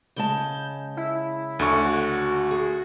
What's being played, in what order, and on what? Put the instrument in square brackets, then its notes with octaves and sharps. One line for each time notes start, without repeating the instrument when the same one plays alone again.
[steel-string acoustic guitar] C#3 G#3 A5 [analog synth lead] G6
[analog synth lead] E4
[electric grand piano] D2 D3 C#6
[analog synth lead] F#4
[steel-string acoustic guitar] G#4